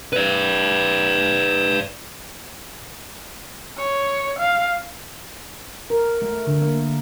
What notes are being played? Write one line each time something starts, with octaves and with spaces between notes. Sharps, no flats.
B4 D5
C#5
F5
A#4
A3
D3
A#3